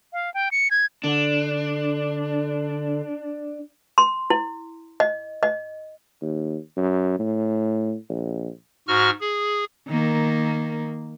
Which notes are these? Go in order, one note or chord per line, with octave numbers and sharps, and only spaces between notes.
F5
G5
C#7
G#6
D3 D4
C6
E4
D#5
D#5
D#2
F#2
A2
A#1
G#2 F#4 C#6 F6
G#4
D#3 A#3